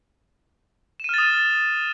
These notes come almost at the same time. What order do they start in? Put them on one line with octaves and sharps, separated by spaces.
E7 D#7 F6 A6 D#6